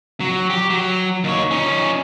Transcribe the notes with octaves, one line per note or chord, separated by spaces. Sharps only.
F#3
G4
F#3
D#2 C#5
C#4 D#4